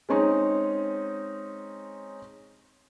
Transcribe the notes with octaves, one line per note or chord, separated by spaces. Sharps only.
G#3 C4 C#4 D#4